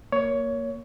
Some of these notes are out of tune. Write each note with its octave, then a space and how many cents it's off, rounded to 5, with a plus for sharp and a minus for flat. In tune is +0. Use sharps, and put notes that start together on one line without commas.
A#3 +0 C#5 +15